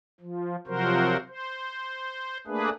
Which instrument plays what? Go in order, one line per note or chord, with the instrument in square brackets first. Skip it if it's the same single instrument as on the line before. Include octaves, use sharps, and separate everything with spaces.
[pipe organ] F3
C3 F3 F#3 F#4 A#4 C5
C5
A3 A#3 D4 G#4 B4